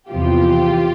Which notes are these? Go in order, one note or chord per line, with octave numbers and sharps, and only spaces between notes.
E2 C3 F3 F4 G4